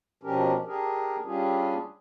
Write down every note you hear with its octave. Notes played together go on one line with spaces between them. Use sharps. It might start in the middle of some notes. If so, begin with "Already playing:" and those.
B2 F3 C#4 D4 G4 A#4
D4 G4 G#4 A#4
G3 C#4 D4 F4 G4 G#4